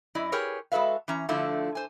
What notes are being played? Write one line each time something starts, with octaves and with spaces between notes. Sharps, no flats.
F#2 E4 D5 D#5
G4 G#4 A#4 B4 C#5
G#3 F#4 A4 B4 E5 F5
E3 C#4 A#5
D3 F3 A3 D4 E4 F4
C5 G#5